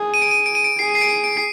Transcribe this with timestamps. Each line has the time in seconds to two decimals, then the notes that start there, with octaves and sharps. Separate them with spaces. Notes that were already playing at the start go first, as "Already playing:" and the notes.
Already playing: G#4
0.14 D#7
0.22 D7
0.31 D#7
0.46 D7
0.55 D#7
0.64 D7
0.79 G#4 C7
0.95 C7
1.01 D7
1.24 D7
1.37 C7